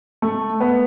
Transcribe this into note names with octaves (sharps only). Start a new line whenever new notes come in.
A3
B3